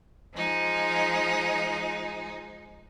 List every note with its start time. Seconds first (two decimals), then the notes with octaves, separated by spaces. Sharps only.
0.32 F3 G#3 D#4